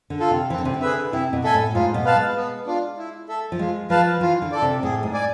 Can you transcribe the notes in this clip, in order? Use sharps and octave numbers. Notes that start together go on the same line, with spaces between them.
D3
F4 A4
C3
E3 C4
D3
C3
D3
G#4 B4 E5
C3 E4
B2
B2 A4 E5 G#5
A2
G#2 F4
B2
B4 F5 A5
G#3
B3
D4 F4
E4
A4 E5
F3
G#3 F4
F3 B4 F5 A5
E3 F4
D3
A4 D5
C3
A2 G#4
G#2
D5 G#5